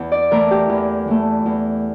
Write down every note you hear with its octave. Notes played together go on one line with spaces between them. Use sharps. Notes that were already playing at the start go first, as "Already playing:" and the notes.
Already playing: E2
D5
E3 A3 A#4
G4
E2
E3 A3
E2